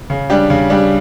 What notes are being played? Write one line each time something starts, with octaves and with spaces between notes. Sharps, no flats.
C#3
G3 D4 G4
C#3
G3 D4 G4